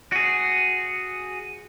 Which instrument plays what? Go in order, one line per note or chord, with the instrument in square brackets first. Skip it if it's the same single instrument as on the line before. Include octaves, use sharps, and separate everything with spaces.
[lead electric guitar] F#4 G#4